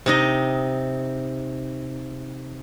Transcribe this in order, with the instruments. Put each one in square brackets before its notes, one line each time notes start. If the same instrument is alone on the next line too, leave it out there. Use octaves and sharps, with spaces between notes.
[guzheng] C3 D#4 D#5